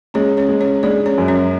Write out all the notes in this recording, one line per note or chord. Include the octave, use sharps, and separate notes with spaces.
G#3 C#4 C#5
C#4 C#5
G#3
C#4 C#5
G#3 D4 D5
C#4 C#5
F#2
C#4 C#5